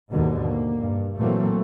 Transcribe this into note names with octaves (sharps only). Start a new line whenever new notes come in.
D#2 G#2 B2 D3 D#3
A#3
G2
A#2 E3 F#3 A3 A#3 C4